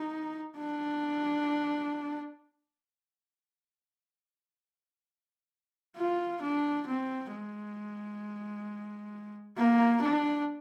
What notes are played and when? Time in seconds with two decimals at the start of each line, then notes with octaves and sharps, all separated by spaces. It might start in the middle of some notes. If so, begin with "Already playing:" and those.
Already playing: D#4
0.57 D4
5.97 F4
6.42 D4
6.87 C4
7.32 G#3
9.57 A#3
10.02 D4